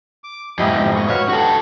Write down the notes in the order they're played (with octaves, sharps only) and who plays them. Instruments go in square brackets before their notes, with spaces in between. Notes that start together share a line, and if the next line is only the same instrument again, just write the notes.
[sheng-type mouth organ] D6
[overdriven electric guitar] F2 G#2 [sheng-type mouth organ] E4 G4 D#5
[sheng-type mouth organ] D#5 C#6
[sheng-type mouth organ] F#4 B4 F5 [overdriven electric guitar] C#5
[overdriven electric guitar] F#4 A4 [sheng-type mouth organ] G4